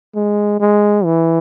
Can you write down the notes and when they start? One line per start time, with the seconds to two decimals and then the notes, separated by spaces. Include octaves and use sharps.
0.15 G#3
0.60 G#3
1.05 E3